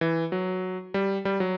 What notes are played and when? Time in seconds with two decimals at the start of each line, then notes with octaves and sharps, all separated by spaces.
0.01 E3
0.32 F#3
0.94 G3
1.25 G3
1.40 F#3